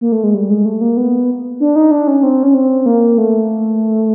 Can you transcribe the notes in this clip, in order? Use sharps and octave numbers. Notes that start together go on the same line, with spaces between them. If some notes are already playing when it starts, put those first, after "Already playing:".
A#3
A3
G#3
G3
G#3
A3
A#3
B3
D4
D#4
D4
C#4
C4
C#4
C4
A#3
A3